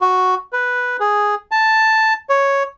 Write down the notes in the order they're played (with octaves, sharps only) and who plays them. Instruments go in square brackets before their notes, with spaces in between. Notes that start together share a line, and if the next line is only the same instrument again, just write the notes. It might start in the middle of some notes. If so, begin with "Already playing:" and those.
[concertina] F#4
B4
G#4
A5
C#5